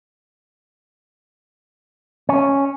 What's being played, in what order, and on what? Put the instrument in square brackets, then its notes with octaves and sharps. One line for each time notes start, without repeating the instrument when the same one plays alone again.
[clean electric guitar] C#4